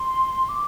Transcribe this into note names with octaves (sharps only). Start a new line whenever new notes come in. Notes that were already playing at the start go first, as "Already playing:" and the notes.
Already playing: C6
D6